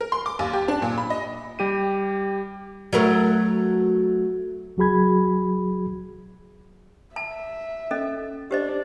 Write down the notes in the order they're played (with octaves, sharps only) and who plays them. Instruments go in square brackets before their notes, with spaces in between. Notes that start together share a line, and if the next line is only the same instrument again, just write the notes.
[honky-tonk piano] A#4
C6
D6
D#2
G4
D4
A#2
B5
D#5
[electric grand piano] G3 G4 D#7
[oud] F#3 A3 A#4
[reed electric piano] C#2 F#3 F#4 G#4 B5 G#6
[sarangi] E5 [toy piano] A5
[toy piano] C#4 A4 D#5
[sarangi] D4 [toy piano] G4 C5 D#5